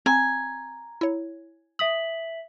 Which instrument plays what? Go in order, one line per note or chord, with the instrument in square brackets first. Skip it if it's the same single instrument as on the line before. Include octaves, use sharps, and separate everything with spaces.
[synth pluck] C4 [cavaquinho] G#5 [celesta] A#5
[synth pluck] E4 C#5
[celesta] E5 B6 F#7 [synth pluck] D#6